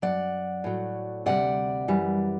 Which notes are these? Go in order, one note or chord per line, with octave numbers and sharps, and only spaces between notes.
F#2 F#3 D5 F#5
A2 F#3
D2 C3 G3 D5 F#5
F#2 E3 G3